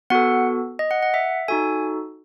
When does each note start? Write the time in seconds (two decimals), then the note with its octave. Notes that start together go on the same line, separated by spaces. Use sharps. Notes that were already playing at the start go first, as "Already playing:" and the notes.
0.10 B3 F#4 A4 F#5
0.79 D#5
0.91 F#5
1.03 F#5
1.14 E5
1.48 D#4 F#4 A4 G#5